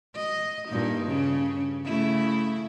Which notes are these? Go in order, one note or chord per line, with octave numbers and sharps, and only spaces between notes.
D#5
G2 A#2 D#4
C#3 C#4
C#3 A3 E4